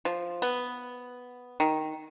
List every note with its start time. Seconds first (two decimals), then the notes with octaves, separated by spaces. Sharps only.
0.05 F3
0.42 B3
1.60 D#3